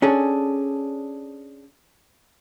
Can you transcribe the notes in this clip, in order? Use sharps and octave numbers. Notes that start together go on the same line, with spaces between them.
C#4 D4 G#4 A4